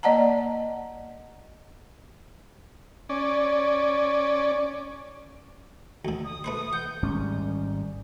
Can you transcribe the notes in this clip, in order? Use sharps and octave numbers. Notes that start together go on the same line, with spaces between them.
A#3 D5 D#5 F#5 A5 A#5
C#4 D5
D2 D3
D#6
A3 B4 C5
F#5 G6
G#1 G#2 G3 C#4